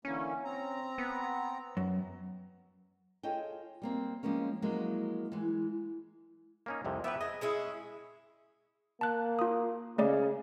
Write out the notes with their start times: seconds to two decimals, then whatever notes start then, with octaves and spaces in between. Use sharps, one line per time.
0.05 D3 E3 A#3 C#4
0.45 C4 A#5
0.98 B3
1.77 F#2
3.23 F4 G#4 A4 C#5 D#5 G5
3.82 G3 A#3 C4
4.23 F3 G3 G#3 A#3 C#4
4.62 F3 F#3 G#3 A#3 E4
5.32 E3 G#3
6.66 A#3 C#4 D#4
6.85 C2 F2 C3
7.04 B3 G4 B4 E5
7.21 G#4 D#5
7.41 G#3 C#4 E4 G#4
9.01 A#3 A5 F#6
9.39 F4 D#6
9.98 C#3 A3 D5 D#5